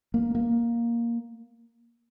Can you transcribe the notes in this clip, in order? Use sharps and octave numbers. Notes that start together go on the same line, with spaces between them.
A#3
A#3